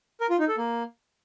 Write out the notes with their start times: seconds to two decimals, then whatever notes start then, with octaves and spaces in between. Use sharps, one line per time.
0.21 A#4
0.30 F4
0.39 D#4
0.48 A4
0.57 A#3